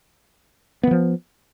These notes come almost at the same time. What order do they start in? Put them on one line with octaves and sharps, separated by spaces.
B3 E3 F3